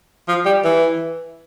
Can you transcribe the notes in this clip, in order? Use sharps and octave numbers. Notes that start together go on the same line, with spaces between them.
F3
G3
E3